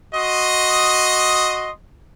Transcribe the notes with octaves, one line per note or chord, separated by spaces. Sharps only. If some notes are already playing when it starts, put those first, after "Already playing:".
F#4 D#5 C6 D#6